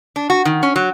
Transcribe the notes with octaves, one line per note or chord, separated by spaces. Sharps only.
D4
F#4
D#3
C#4
F#3